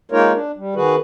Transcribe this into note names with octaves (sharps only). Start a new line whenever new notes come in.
G#3 A#3 D#4 F4 A#4 C#5
D4
G3
D#3 F#4 G#4 B4